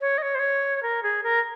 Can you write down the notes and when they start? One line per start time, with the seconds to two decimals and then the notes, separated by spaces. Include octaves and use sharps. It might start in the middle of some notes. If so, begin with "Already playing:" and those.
0.01 C#5
0.18 D#5
0.22 C#5
0.35 C5
0.39 C#5
0.83 A#4
1.03 G#4
1.23 A#4